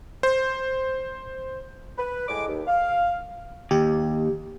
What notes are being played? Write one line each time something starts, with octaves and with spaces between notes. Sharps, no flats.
C5
B4
A2 G#3 D6
D#2
F5
D#2 G4